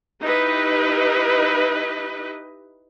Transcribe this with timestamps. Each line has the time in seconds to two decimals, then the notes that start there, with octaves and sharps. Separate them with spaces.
0.21 D#4 E4 G4 B4 D#5